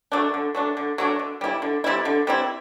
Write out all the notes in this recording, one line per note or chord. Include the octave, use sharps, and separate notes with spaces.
F#3 A3 D4
D3
F#3 A3 D4
D3
F#3 A3 D4
D3
G3 C4 E4
D3
G3 C4 E4
D3
G3 C4 E4